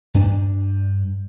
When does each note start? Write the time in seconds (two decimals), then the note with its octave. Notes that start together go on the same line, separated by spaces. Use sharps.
0.14 G2 D4